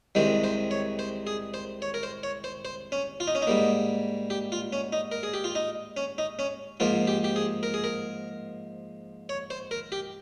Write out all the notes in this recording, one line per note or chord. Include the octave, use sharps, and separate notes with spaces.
C2 C3 D#3 G#3 C5
C5
C#5
C5
G#4
C5
C#5
A#4
C5
C#5
C5
C5
C#4
F4
D#4
C#4
D#4
G#2 G3 A#3
G4
F4
C#4
D#4
A#4
G#4
G4
F4
D#4
C#4
D#4
C#4
G#2 F3 A#3 F4
G4
G4
G#4
A#4
G#4
A#4
C#5
C5
A#4
G4